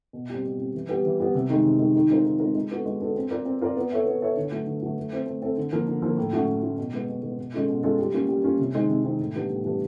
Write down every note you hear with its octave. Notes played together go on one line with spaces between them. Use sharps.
B2
G3 C4
B2
G3 C4
E3
G3 B3
E3
G3 B3
C3
D#3 G#3
C3
D#3 G#3
D#3
G#3 C4 F4 A#4
D#3
G#3 C4 F4 A#4
G#3
B3 D4 F#4 A4
G#3
B3 D4 F#4 A4
C4
F4 A#4 D5
C4
F4 A#4 D5
B3
E4 A4 C#5 E5
B3
E4 A4 C#5 E5
D3
F#3 A3
D3
F#3 A3
A3
C4 E4 A4 C5
A3
C4 E4 A4 C5
D3
F3 A#3
D3
F3 A#3
A2
F#3 A3 C#4
A2
F#3 A3 C#4
B2
G#3 B3
B2
G#3 B3
B2
G#3 C#4 F4 A4
B2
G#3 C#4 F4 A4
G3
A#3 C#4 F4
G3
A#3 C#4 F4
C3
D#3 G#3 C4
C3
D#3 G#3 C4
A2
E3 G3 B3 D4
A2
E3 G3 B3 D4